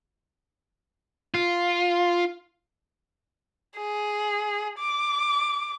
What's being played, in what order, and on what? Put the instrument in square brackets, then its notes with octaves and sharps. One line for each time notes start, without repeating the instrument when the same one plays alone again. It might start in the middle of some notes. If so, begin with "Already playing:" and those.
[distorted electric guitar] F4
[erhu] G#4
D6